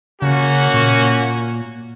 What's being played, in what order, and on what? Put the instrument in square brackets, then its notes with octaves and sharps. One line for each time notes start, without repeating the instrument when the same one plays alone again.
[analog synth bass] C#3 [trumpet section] A#3 C#4 F#4
[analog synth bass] A#2